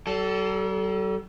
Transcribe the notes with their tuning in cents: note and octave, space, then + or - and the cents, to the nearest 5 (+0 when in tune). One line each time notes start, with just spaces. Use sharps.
G3 -45 A4 +0